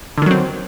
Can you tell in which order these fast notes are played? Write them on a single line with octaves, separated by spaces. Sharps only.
D3 D#3 F#3 C4